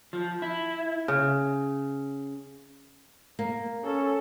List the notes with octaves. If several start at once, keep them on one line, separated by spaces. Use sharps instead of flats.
F3
E4
C#3
A#3
C#4 A4